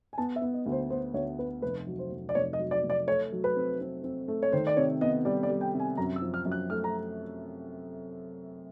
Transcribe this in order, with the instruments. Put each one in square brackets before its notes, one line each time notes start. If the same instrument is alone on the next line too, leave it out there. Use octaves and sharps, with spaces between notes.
[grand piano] G#5
[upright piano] B3 [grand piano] A5
[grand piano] E5
[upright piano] B3
[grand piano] D#5
[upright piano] D2
[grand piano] C5
[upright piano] B3 [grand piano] C5
[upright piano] D2 [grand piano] C#5
[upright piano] B3 [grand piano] B4
[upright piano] F1 [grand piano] B4
[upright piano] F#3
[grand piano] C5
[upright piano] F1
[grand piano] D5
[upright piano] F1 [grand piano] C#5
[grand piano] D#5
[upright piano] F#3
[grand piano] D5
[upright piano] F1
[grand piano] D5
[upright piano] A3 [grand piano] C#5
[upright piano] F#3
[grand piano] B4
[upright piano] C4
C4
C4
A3
[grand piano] C#5
[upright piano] D#3 [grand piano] C5
[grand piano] D5
[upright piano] C3 [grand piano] C#5
[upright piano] B3 [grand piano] D#5
[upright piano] G3 [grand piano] D5
[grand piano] D5
[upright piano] G3
[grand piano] G5
[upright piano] C3
[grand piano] G#5
[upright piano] F#2 [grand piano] A#5
[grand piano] E6
[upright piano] F3
[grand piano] F6
[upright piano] F#2
[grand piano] F#6
[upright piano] A3 [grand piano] F6
[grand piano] A#5